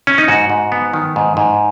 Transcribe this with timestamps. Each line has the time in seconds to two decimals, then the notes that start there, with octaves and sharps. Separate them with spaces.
0.07 C#4
0.18 D#4
0.28 G#2 F#4
0.50 G#2
0.72 B3
0.93 D#3
1.16 G#2
1.37 G#2